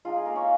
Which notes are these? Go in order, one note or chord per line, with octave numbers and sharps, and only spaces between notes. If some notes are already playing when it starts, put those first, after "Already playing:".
G#3 D#4 F4
G#4
A#3 A#4
C#4 C#5